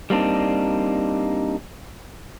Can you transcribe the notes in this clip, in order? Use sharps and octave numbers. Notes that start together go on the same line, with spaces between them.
G3 A#3 C4 D4 D#4